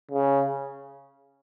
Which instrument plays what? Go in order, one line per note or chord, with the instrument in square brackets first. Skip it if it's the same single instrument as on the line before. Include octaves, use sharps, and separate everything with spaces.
[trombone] C#3